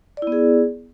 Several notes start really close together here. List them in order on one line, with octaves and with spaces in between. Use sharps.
D5 E4 B3 G#4